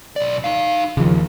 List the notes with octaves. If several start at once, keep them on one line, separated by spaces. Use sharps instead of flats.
B1 D5
D#4 F5
D#2 C#3 F3